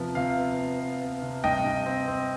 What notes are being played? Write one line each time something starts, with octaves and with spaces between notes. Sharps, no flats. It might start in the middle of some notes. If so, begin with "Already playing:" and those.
Already playing: C3 F3 B3
C3 F5
B3
B3
B3
B3
C3
G2 D#5 G5
G2
C4
C4